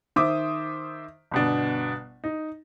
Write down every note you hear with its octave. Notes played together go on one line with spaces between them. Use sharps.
D#3 C5 E5 D6 D#6
G1 B2 D4
D#4